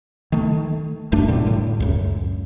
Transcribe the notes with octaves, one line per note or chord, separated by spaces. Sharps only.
D#3 A3
A1 F#2 A3 D4
E2 A#2 D3 G3
A2
C#2 F#2